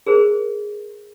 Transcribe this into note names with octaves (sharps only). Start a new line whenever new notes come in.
G#4 A#4 C5